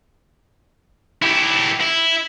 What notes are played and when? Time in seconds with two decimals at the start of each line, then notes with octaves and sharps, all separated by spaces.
1.22 E4 G4
1.81 E4